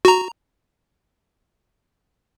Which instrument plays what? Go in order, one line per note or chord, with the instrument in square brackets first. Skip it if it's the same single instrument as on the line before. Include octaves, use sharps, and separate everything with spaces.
[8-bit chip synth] F#4 A#5